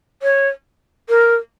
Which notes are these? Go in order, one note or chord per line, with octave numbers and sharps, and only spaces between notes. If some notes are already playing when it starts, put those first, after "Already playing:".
C#5
A#4